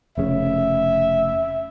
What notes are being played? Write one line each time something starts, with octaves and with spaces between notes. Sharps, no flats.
F1 C#3 E5